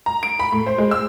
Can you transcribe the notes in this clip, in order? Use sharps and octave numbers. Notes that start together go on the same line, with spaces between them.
A#5
D7
B5
A2
C5
G#3
E6